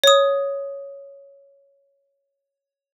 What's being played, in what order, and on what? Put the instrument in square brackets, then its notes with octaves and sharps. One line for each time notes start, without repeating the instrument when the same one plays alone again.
[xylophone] C#5 D#6